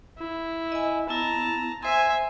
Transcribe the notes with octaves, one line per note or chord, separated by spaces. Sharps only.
E4
D#5 G#5
B3 E4 A5 A#5
C5 E5 G#5 C6